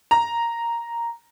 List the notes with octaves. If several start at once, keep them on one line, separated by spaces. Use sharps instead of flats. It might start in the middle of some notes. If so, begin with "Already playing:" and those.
A#5